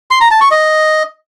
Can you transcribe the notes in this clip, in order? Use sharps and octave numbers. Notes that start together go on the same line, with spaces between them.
C6
A#5
A5
C#6
D#5